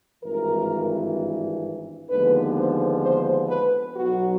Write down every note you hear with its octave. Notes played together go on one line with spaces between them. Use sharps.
G#1 G2 E3 A#4
D#2 D3 F3 G#3 B3 B4
C5
C5
B4
B1 B2 F#3 F#4